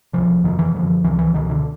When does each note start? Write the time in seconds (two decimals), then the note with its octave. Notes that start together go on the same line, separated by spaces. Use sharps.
0.13 C2 C3 F3
0.44 F2 C3 D#3
0.59 E3
0.74 F#2 D3 F3
1.04 C#2 C3 E3
1.19 E3
1.34 C#2 B2 D#3
1.50 D3